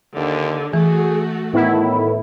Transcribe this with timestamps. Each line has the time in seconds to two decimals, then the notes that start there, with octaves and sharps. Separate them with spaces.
0.16 D#2 D3
0.73 E3 A3 F#4 G#4
1.53 A2 D#3 B3 E4